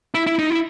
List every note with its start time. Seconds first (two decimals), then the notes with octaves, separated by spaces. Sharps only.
0.14 E4
0.27 E4
0.39 D#4
0.50 E4